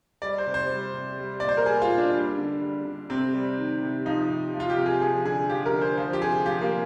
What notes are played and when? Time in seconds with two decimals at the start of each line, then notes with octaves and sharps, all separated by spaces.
0.22 G3 D5
0.38 C5
0.47 C3
0.54 C5
0.70 G3
0.94 C3
1.17 G3
1.40 A#2 D5
1.49 C5
1.57 A#4
1.66 G3 G#4
1.82 F4
1.90 A#2
1.98 D4
2.14 G3
2.38 D3
2.62 G3
2.85 D3
3.10 C3 C4
3.34 G3
3.58 D#3
3.82 C3
4.06 F3 D#4
4.30 C3
4.54 F3
4.60 F4
4.70 G4
4.78 C3
4.86 G#4
5.02 F3 G#4
5.25 D3 G#4
5.49 F3 G4
5.66 A#4
5.74 D3
5.81 C5
5.97 F3 C5
6.13 G4
6.22 C3 G#4
6.46 F3 G4
6.61 A#3
6.70 C3